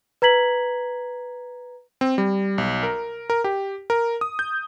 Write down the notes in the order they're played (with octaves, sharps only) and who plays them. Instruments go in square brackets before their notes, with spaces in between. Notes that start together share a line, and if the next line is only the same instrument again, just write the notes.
[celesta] B4 A#5 G#6 B6 F#7
[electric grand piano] C4
G3
B1
A#4
A#4
G4
A#4
D#6
G6